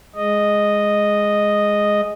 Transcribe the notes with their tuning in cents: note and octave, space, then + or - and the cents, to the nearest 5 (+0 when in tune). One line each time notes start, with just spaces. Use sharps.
G#3 +0 D#5 -5